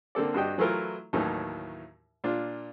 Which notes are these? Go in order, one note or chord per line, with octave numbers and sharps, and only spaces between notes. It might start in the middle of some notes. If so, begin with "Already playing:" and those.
D3 A#3 C4 A4 D5
G2 D4 F#4 G4 D#5 G5
E3 F#3 A3 E4 F4 A#4
D#2 A2 D#3 E3 F#3
A#2 D4 F4